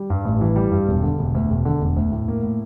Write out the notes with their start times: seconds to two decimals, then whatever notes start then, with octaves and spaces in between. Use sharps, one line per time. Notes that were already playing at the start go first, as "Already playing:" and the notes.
Already playing: G3
0.10 G2
0.25 A1
0.41 E3
0.56 G3
0.72 G2
0.88 E1
1.03 D3
1.19 E1
1.35 D2
1.50 E1
1.65 D3
1.81 E1
1.96 D2
2.12 A2
2.28 A#3
2.43 A2